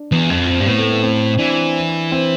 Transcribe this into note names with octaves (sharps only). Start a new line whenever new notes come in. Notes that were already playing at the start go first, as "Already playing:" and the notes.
Already playing: D4
E2
F2 C4
C4
G2
A2 B3
A3
B3
C4
E3 D4
C4